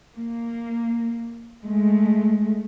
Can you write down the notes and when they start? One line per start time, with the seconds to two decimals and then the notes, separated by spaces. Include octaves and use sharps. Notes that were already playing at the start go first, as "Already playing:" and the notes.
0.14 A#3
1.63 G#3 A3